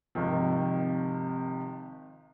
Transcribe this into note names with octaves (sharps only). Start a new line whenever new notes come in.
G#1 C3 D#3 F3